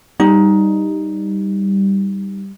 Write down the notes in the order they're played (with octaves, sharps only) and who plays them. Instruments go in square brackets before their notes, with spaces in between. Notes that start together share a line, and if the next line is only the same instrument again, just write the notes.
[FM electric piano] G3 [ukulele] D#4